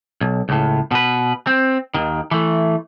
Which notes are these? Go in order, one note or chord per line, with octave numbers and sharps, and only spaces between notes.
B1
C#2 A2
B2 B4
C4
D#2 D#3
E3 A3